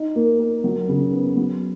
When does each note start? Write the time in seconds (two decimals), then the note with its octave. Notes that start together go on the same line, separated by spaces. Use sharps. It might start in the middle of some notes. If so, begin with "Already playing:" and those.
Already playing: D#4
0.15 A#3
0.39 A#4
0.64 F#3
0.89 C#3
1.12 B3
1.37 F#3